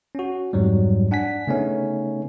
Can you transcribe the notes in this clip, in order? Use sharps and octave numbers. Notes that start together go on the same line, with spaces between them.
C#4 F#4
F2 G#2 F#3 G3
D4 F#5 G#5 B6
C#3 A3 B3 C#4 D#4